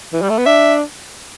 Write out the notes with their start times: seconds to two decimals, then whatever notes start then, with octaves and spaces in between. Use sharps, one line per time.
0.13 E3
0.22 G3
0.30 A3
0.38 B3
0.46 D4 E5